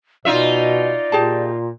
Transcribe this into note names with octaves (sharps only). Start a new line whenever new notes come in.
B2 D#4 F4 D5 E5
A#2 G4 G#4 A5